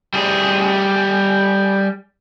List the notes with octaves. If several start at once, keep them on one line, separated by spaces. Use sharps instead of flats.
G3 G#4